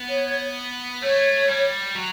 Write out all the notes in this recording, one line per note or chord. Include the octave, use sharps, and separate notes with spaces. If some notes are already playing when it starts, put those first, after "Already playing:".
Already playing: B3
C#5
A3 C#5
G3
F#3